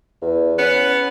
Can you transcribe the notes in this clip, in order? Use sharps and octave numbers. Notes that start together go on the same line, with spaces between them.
E2
B3 C#4